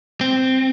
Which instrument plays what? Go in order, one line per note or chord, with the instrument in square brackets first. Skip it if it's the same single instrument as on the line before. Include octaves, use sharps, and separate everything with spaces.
[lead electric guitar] C4